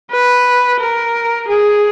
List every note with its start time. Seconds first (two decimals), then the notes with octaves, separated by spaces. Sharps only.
0.11 B4
0.80 A#4
1.48 G#4